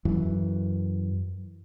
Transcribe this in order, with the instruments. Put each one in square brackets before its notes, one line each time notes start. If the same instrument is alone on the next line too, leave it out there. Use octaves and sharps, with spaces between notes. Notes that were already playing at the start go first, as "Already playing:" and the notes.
[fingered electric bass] F#2 E3